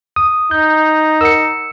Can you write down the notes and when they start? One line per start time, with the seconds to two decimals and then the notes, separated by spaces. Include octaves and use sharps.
0.16 D#6
0.51 D#4 G6
1.21 A#4 F#5 E6 C#7